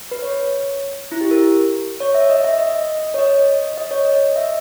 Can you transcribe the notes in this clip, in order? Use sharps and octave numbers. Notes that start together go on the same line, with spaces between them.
B4
C#5
E4
G4
A#4
C#5
E5
D#5
E5
D#5
C#5
D#5
D#5
C#5
D#5
E5